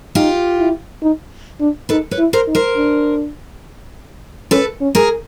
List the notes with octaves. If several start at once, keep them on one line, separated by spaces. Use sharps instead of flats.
D#4 F4 G4
E4
D#4
D4
D#4 A4 B4
B4 C#5
E4
A#4 C5
D#4
A#4 C5
D4
C#4 A4 B4
C#4
G#4 A#4